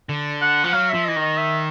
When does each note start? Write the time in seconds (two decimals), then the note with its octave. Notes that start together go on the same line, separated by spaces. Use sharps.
0.09 D3
0.41 F#5
0.64 F3 F#5
0.72 F#3 F5
0.90 F3 E5
1.04 E3 D#5
1.16 D#3 D#5
1.37 E5